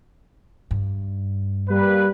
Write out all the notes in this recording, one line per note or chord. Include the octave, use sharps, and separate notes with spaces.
G2
G3 A#3 B4